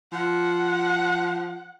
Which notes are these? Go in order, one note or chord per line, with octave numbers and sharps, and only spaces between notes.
F3 F#5